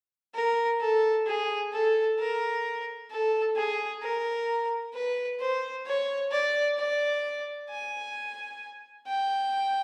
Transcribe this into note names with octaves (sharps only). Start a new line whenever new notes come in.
A#4
A4
G#4
A4
A#4
A4
G#4
A#4
B4
C5
C#5
D5
D5
G#5
G5